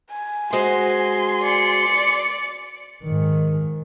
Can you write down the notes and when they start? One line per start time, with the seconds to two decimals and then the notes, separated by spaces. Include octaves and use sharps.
0.10 G#5
0.53 G#3 F#4 C5 C6
1.43 D5 C#7
3.04 G#2 D#3